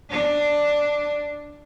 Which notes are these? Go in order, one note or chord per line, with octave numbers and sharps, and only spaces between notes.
D4